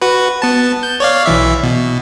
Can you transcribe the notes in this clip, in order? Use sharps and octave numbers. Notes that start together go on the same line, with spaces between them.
F#4 B4
B3 A5
G6
C#5 D5 F5
B1 E3 E5
B2